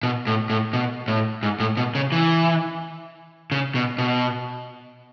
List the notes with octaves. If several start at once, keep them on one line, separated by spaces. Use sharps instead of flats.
B2
A2
A2
B2
A2
G#2
A2
B2
C#3
E3
C#3
B2
B2